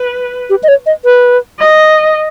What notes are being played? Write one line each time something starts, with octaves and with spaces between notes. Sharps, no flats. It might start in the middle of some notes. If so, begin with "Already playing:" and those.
Already playing: B4
G4
D#5
C#5
D#5
B4
D#5